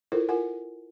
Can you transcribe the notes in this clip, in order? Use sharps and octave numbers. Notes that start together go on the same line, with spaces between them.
E4 F4 A4 A#4 C5
F4 A#4 F#5 G#5